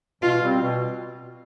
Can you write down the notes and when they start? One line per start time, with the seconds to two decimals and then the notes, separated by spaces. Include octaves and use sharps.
0.22 B2 F4
0.42 G3 C4
0.61 B2